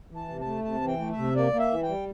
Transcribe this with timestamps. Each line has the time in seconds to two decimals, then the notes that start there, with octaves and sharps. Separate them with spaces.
0.11 E3
0.16 A5
0.29 C3
0.41 A5
0.46 A3
0.64 C3 A5
0.82 E3
0.87 G5
1.00 A3
1.12 E5
1.18 C3
1.36 A#3 D5
1.53 A#3
1.59 E5
1.71 E3
1.83 G5
1.89 G3